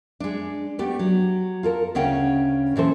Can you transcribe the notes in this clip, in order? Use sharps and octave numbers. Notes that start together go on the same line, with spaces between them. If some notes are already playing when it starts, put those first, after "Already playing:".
G#3 D4
A3 B3 D4 G4
F#3
F4 A4 A#4
D2 C#3 C#4 F#5 G5
A#2 E3 A4 C5